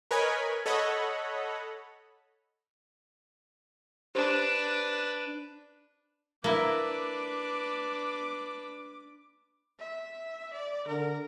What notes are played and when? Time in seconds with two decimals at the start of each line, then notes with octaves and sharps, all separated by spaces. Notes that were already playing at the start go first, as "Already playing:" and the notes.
0.11 A#4 B4 C#5 D#5 G#5 B5
0.66 A4 C#5 D#5 F#5 B5
4.15 D4 G4 B4 C5
6.44 A#3 D4 E4 B4 D6
9.80 E5
10.53 D5
10.88 D3 A#4